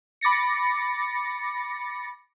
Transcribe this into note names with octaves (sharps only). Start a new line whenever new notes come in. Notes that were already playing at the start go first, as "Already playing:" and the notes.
B5 D6 A6 A#6 C#7